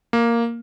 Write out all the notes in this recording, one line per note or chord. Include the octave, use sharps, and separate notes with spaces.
A#3